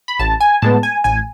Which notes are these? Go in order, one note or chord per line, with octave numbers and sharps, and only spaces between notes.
B5
A1 A5
G#5
A2 G#3 B3 A5
G#5
A1 G#5